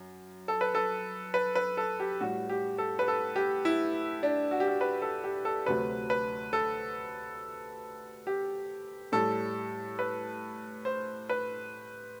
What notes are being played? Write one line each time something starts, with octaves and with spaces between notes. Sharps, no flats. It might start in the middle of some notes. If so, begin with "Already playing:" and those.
Already playing: F#2
A4
B4
A4
B4
B4
A4
G4
A2 G3 F#4
G4
A4
B4
A4
G4
E4
D4
F#4
G4
F#4
B4
A4
G4
A4
D2 C3 F#3 A3 B4
B4
A4
G4
A2 G3 A4
B4
C5
B4